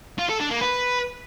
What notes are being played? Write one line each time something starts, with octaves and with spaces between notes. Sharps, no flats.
F4
A4
D4
A#3
B4